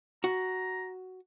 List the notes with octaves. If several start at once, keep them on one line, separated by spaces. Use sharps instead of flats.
F#4 A#5